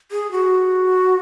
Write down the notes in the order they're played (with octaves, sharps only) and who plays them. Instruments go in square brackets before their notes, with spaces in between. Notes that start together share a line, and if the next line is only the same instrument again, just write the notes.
[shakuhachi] G#4
F#4